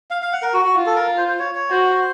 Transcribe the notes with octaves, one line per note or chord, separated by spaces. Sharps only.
F5
F5
F#5
A#4
F#4
F#4
F4
A4
A#4
C5
C5
C#5
C#5
F#4 C5